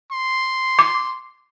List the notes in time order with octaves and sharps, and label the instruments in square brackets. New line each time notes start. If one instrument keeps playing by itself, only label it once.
[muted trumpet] C6
[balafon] D6